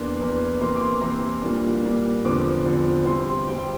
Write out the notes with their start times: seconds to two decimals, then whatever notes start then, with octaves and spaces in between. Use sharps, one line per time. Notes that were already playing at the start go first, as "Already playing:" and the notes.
Already playing: E2 E3 A#3 D4 C6
0.19 E2 E3 A#3 D4
0.61 C3 E3 A#3 C6
0.75 D6
0.81 C6
1.02 C3 E3 A#3 A#5
1.42 A#2 G3 A#3 D4
1.84 A#2 G3 A#3 D4
2.24 E2 D3 F3 C4 D6
2.66 E2 D3 F3 C4
3.06 C3 G3 C4 C6
3.26 C6
3.47 C3 G3 C4 G5
3.58 G5